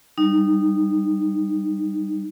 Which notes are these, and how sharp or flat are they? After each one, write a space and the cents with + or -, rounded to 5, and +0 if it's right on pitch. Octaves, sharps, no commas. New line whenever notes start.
G3 +0 D#4 -20